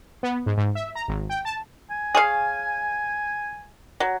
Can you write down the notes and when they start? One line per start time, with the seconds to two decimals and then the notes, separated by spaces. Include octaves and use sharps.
0.23 B3
0.46 G#2
0.57 G#2
0.75 E5
0.95 A#5
1.08 G#1
1.30 G5
1.45 A5
1.90 G#5
2.15 G#4 C#5 F5
4.00 F#3